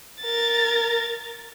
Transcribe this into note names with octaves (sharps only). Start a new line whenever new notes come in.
A#4 A6